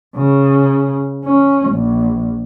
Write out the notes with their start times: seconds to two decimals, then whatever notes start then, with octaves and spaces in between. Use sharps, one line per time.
0.16 C#3
1.24 C#4
1.70 A#1